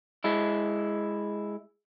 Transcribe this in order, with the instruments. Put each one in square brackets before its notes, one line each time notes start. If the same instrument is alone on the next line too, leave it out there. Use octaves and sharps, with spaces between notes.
[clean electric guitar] G#3 E4